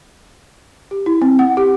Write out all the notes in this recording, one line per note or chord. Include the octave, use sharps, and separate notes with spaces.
G4
E4
C4
F#5
G4